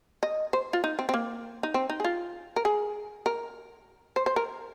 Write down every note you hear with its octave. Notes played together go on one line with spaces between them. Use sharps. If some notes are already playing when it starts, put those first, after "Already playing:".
D#5
C5
F4
D#4
C4
C4
A#3
D#4
C4
D#4
G#4
F4
A#4
G#4
A#4
C5
C5
A#4